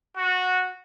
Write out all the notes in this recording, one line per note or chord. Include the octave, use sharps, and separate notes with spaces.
F#4